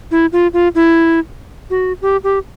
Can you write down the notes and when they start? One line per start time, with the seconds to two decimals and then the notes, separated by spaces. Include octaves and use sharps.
0.11 E4
0.32 F4
0.53 F4
0.75 E4
1.70 F#4
2.02 G4
2.24 G4